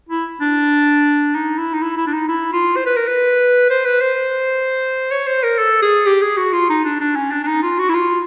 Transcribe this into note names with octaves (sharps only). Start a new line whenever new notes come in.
E4
D4
D#4
E4
D#4
E4
E4
D4
D#4
E4
F4
C5
B4
A#4
B4
C5
B4
C5
C#5
C5
A#4
A4
G#4
G4
G#4
F#4
F4
D#4
D4
D4
C#4
D4
D4
D#4
F4
F#4
E4
F4